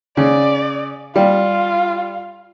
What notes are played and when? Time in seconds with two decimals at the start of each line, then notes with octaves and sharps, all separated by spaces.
0.17 C#3 D5
1.16 G3 F4